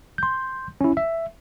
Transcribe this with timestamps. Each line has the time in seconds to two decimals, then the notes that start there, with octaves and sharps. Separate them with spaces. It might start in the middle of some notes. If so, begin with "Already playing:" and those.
0.18 C6 G6
0.81 C#4 E4
0.97 E5